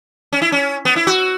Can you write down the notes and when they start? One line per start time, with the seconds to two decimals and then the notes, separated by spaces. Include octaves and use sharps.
0.33 C#4
0.42 E4
0.52 C#4
0.85 B3
0.96 E4
1.07 F#4